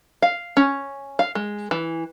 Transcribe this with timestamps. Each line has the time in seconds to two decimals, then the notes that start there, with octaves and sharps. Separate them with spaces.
0.22 F5
0.57 C#4
1.19 F5
1.35 G#3
1.71 E3